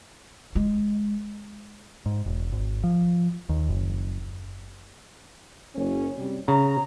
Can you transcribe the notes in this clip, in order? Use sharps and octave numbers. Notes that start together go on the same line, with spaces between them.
G#3
G#2
E1
G#1
F3
D#2
F#1
F#1 C#4
C3 G3
C#3 A#5